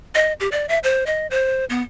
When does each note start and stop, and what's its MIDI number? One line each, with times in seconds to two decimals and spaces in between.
0.15 0.33 75
0.40 0.49 67
0.52 0.66 74
0.69 0.79 76
0.83 1.04 72
1.06 1.27 75
1.31 1.65 72
1.70 1.82 59